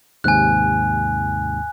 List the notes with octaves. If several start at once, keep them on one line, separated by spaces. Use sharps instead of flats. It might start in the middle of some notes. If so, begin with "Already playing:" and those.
D#2 G#2 C3 G#5 F#6